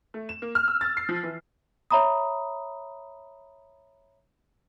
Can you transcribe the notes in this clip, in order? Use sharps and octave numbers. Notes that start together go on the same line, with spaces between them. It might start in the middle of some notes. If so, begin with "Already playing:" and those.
A3
E7
A#3
F6
E6
A6
C7
F3
E3
C#5 E5 A#5 B5 D#6